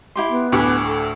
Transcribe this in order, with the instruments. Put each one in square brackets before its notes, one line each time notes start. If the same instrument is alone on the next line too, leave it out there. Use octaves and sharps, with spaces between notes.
[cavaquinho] E4 G4 C6
[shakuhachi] B3
[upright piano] D2 A2 [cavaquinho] G4 G#5
[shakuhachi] A4